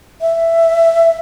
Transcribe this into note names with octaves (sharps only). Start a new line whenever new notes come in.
E5